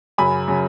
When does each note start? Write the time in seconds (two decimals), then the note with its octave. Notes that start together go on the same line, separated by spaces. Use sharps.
0.18 F#2 C#3 F#3 G#5 B5
0.48 C#3 F#3